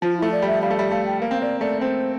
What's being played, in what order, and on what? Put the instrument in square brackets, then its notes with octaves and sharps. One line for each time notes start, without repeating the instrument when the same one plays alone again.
[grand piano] F3 [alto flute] F4
[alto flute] E4
[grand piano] A3
[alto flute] D5
[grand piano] G3
[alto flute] E5
[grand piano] G3 [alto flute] F5
[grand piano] A3
[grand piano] G3 [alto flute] E5
[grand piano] A3 [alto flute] F5
[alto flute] G5
[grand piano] A#3 [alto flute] F5
[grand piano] C4
[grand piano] A#3 [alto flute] D5
[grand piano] A3 [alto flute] D5
[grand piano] C4 [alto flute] C5